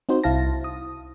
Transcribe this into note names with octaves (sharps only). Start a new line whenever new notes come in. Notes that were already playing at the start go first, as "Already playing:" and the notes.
C4 D#4 F#4 C5
C2 E4 F5 A5 A#6
D#6